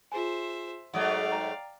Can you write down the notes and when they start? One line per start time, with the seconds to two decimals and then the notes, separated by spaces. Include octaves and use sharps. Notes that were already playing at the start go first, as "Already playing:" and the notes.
0.12 F4 G#4 C5 E5 G#5
0.94 G#2 F#3 A3 D5 F5 F#5 D#6
1.32 G5 A#5